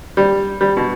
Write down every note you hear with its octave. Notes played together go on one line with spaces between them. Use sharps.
G3
G3
B2